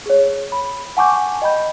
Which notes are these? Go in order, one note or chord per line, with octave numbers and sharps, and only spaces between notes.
G#4 C#5
B5
F#5 G#5 A5 C#6 D6 G6
D#5 G5 B5 G6